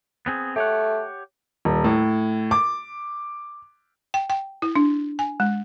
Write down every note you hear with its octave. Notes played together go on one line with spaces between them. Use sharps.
B3 C4 G#4
A3 G4 C#5 F#5
D#1
A2
D6
G5
G5
E4
D4
G#5
G#3